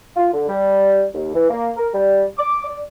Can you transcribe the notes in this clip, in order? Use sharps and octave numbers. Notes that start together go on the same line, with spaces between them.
F4
D3
G3
D#2
E3
A#3
A#4
G3
D6
D5